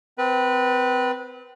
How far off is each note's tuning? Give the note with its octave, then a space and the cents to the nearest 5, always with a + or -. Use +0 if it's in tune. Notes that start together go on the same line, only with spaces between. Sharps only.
C4 -30 B4 -15